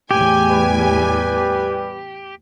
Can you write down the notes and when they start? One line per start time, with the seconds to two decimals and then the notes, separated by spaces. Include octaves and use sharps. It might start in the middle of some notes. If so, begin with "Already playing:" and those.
0.11 E2 A2 G4 G#5
0.50 G3 B4